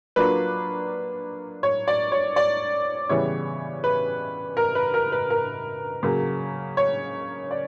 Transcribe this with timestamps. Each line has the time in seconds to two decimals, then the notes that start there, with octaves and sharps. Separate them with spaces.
0.16 F#3 A#3 D4 F4 B4
1.63 C#5
1.88 D5
2.12 C#5
2.36 D5
3.09 C#3 E3 G3 B3 E4 C#5
3.84 B4
4.57 A#4
4.75 B4
4.94 A#4
5.12 B4
5.30 A#4
6.03 C#3 F#3 A#3
6.77 C#5
7.51 D5